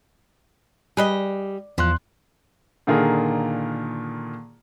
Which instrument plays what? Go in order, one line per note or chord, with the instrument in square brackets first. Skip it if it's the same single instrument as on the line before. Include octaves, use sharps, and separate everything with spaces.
[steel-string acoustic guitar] G3 [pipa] G#4 B4 D#5
[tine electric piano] E2 C6 F#6 [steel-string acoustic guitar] F3
[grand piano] A#2 D3 D#3 F4 G#4 A#4